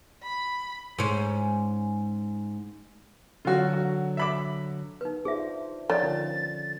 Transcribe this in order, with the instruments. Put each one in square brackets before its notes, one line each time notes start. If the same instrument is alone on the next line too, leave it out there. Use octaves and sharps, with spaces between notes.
[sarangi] B5
[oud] G#2 C#4
[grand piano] D3 F#3 [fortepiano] F4 F#4
[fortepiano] F#4
E5 B5 D6
[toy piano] D#4 B4
[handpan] D4 F4 C5 [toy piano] G#4 E5
[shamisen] D#3 [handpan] F3 [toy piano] C#5 D5 [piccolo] A6
[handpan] D3 C#4 F4